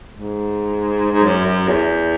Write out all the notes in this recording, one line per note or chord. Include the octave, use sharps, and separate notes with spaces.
G#2
G#2
F#2
F#2
E2